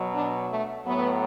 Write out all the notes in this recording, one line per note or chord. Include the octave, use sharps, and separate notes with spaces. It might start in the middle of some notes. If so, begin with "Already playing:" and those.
Already playing: B2 F#3
D4
A3
A2 F#3 B3